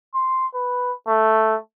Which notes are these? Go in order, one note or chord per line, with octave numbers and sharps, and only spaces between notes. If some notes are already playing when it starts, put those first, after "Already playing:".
C6
B4
A3